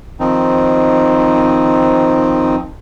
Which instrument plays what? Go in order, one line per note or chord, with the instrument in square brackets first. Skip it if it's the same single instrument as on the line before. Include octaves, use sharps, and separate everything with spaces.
[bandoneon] D#3 F3 C4 D#4